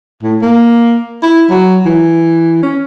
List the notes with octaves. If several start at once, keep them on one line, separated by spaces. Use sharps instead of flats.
A2
A#3
E4
F#3
E3
C#4